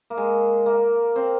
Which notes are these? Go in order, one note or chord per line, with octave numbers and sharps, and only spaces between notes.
A#3
G#3
A#3
C4